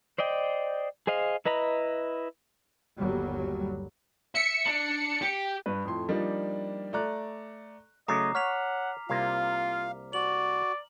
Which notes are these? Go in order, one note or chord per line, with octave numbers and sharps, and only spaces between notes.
C5 D5 D#5 G5
G#4 C5 D#5 F5
E4 B4 D#5 A#5 B5
G1 D#2 F#3 G3
E5 C#7
D4
G4
G2 B4
F2 A2 C6
F3 G3 A#3 D4 D#4
A3 D5 A#5 F#6
C#3 F#3 A3 D#5 A#5 D6 C7
C#5 F#5 F6 B6 F7
C2 C3 A#3 F4 F5
F#4 D5 F#7